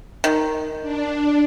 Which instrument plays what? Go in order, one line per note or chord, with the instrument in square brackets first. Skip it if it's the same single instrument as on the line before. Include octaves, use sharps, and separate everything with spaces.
[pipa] D#3
[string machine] D4